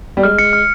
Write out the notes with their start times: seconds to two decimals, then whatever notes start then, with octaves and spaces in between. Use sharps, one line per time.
0.17 G3
0.23 G#3 F6
0.39 C#7
0.53 F6